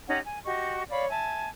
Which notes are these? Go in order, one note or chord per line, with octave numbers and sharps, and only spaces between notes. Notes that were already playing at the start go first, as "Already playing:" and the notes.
C#4 D#4 G4 F#5
G#5
F#4 G4 D#5 C#6
C#5 D5 F5 B5
E5 G#5 A5